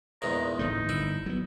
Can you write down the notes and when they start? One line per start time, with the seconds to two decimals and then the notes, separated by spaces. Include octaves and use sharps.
0.22 A#1 E2 G#2 A#5
0.59 G#1 A2 A3 D#4
0.89 G1 D3 E4
1.26 F#3 B3